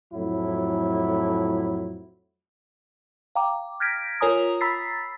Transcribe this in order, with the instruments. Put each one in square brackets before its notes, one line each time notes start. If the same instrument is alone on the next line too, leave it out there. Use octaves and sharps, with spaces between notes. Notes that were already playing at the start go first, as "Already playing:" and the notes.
[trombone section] F2 A2 F#3 E4
[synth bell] F5 G5 A#5 D6
F6 G6 G#6 A#6 B6 D7
F4 A#4 C#5 G#5 A#5 D#6
A#5 B5 E6 A6 B6 C7